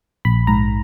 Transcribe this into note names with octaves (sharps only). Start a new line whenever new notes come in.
A#1 B5
G#2 A#5